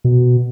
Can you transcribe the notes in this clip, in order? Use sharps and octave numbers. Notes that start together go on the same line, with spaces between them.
B2